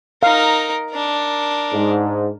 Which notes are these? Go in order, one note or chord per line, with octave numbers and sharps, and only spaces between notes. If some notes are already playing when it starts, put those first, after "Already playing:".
D#4 A#4 F5
D4 A#4
G#2